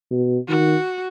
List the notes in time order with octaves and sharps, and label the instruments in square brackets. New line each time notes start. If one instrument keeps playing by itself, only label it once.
[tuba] B2
[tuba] D#3 [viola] F#4